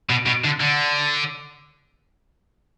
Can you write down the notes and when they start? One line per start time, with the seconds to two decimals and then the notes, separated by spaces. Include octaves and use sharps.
0.10 B2
0.26 B2
0.44 D3
0.60 D3